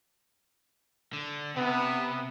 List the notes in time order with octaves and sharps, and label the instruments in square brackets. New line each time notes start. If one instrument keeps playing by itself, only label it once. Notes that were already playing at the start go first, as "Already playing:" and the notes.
[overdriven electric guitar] D3
[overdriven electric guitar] C3 [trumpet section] B3